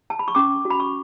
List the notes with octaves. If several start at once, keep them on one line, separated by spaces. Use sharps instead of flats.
A5
B5
C#6
C#4 D6
F#4
B5
C#6